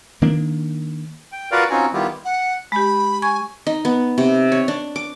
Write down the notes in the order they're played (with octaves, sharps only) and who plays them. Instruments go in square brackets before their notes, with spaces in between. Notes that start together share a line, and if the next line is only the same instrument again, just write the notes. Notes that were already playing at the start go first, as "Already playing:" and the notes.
[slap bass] D#3 A#3 D4
[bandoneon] G5
F4 F#4 A#4 B4 D5 F5
C4 C#4 D#4 F4 F#4 G#5
D#3 G3 B3 E4 F4 G4
[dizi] F#5
[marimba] G#3 G4 [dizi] B5
[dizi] G#5 [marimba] C#6 G#6
[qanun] D#4
B3
C3
C#5
D4
D6